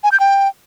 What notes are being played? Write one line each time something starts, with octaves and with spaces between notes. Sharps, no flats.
G#5
G6
G5